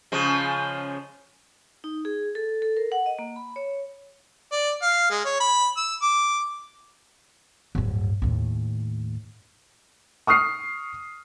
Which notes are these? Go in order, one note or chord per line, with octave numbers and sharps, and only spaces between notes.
C#3 F3 G#3
D#4
G#4
A4
A4
A#4
F#5
D#5
A#3
B5
C#5
D5
F5
G#3
C#5
B5
E6
D6
D1 G2
D#2 A2
C#6 D#6 F6 C7